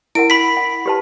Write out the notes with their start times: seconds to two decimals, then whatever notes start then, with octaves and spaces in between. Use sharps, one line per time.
0.15 E4 A#4 F#5 D7
0.30 B5 B6
0.57 F#5
0.86 G4 B4 A5